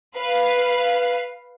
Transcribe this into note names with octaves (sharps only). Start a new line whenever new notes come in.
B4 F5